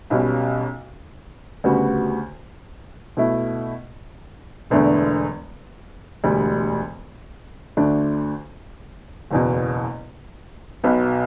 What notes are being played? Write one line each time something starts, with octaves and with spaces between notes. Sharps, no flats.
B1 B2 G3 C#4
D2 C#3 G3 B3 F#4
B2 A3 E4
E1 E2 D3 A3 D4
E1 D2 D3 G3
D2 D3 A3 D4
F#1 E2 B2
B1 B2 F#3 B3